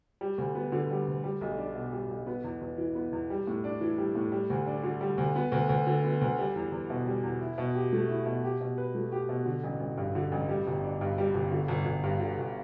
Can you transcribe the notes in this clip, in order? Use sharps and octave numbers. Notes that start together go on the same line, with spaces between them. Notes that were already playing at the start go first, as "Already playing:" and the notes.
G3
D2
B3
D3
G3
D2
G3
B1
D4
B2
G3
B1
B3
E2
E2
E3
B3
E2
G3
A2
D4
E3
G3
A2
G3
D2
D4
D3
G3
D2
B3
D2
D2
D3
B3
D2
G3
E2
E2
B2
G3
E2
E4
B2
G4
A3
E4
B2
G4
B2
B4
A3
G4
B2
D3
A1
A1
G2
D3
A1
G3
G1
D4
G2
G3
G1
D3
G1
G1
G2
D3
G1